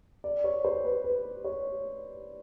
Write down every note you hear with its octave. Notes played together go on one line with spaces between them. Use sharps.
D5
C#5
C5
B4
B4
C#5